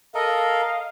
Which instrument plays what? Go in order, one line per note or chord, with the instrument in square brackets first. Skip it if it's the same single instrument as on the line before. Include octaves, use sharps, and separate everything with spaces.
[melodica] A4 A#4 [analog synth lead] D#5 [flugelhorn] F5